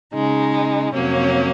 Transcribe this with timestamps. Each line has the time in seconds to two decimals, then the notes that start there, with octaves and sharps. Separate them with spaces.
0.13 C#3 G#3 D#4
0.93 F2 C3 F#3 A#3 C#4